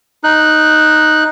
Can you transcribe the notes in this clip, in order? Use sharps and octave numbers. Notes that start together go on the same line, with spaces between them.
D#4 F#6